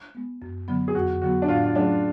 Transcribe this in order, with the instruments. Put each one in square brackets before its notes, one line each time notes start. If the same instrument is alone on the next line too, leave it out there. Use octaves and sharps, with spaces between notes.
[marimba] G#3 B3
F#2
D3 F#3 B3
[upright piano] G#4
[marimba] F2 [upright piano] F#4
[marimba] D3 F#3 B3 [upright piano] F#4
[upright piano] D4
[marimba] A2 [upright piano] F4
[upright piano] F4
[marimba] F#3 A3 C#4 G#4 [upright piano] D4